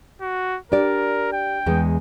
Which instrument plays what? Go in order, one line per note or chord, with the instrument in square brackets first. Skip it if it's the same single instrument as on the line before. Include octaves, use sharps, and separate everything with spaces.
[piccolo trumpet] F#4
[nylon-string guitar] D4 G4 D5 [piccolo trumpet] A#4
[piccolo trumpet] G5
[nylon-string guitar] E2 G#3